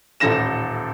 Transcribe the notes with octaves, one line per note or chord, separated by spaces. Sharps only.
D#1 A1 A4 A#6 E7